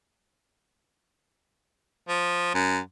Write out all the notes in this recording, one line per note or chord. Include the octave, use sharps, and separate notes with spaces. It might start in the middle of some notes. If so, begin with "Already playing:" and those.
F3
F#2